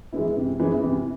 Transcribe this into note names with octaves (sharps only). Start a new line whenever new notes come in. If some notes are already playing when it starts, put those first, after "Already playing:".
E3 G#3 B3 E4
C3
E3 G#3 B3 E4
C3